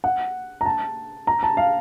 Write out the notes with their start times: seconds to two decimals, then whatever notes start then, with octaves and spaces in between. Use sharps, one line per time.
0.04 F#5
0.61 A#5
0.66 A5
1.27 A#5
1.43 A5
1.57 F5